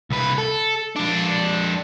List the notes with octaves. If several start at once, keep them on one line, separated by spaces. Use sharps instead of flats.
C2 B4
A4
F2 D4